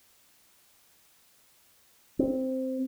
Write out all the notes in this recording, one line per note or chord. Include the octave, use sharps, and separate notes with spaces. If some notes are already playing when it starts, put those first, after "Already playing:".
C4